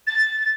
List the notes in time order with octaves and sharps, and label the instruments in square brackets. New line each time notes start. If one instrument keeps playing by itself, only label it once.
[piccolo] A6